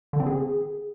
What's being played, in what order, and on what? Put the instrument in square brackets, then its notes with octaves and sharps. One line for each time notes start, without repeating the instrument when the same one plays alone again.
[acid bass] D3
C4
G#4